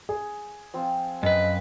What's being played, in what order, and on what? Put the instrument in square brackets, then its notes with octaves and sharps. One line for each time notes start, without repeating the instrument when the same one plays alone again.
[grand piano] G#4
[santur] F3 C4
[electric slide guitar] F#2 B4 [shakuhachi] D#5